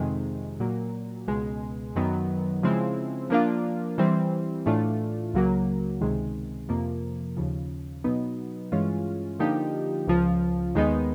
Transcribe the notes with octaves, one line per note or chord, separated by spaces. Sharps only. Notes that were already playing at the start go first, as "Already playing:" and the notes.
Already playing: F2 C3 D#3 G#3
A#2 F#3 A#3
C#2 B2 G#3
F#2 D#3 F#3 B3
C#3 F3 G#3 C4 E4
F3 A#3 D4 F4
E3 G3 C4
A2 E3 A3 D4 F4
C#2 C#3 F#3 A#3
C#2 C3 D#3 G#3
F2 C3 F3 A#3
D#2 C#3 F3
B2 F#3 B3 D#4
G2 E3 G#3 C#4 F4
D3 F3 A#3 D#4 G4
C#2 C#3 F3
D#2 D#3 G#3 B3 D#4